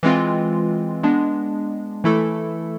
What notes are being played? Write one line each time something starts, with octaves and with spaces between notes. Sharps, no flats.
E3 G#3 C4 F4
G#3 B3 D4
E3 A3 E4 A4